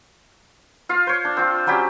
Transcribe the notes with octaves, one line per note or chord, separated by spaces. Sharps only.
F4 F5
C5 C#5
D4
C4 F4
F#3 G3 C#4 G4